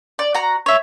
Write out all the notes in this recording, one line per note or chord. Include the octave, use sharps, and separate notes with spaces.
D5
F#4 A#5
C#5 E5